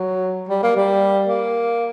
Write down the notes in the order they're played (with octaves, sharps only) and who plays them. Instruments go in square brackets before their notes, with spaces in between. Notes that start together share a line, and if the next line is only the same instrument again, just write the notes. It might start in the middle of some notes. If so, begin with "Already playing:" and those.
Already playing: [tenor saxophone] F#3
G3
A#3
G3
A#3